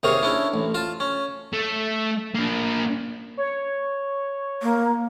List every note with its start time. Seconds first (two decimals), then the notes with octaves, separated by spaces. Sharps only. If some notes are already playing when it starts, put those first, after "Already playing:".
0.03 D#2 C3 A#3 G#4 C#5
0.23 C#4 D4 E4
0.54 A1
0.75 F4 A5
1.00 C#4
1.53 A3
2.35 A#3 D4
3.37 C#5
4.63 A#3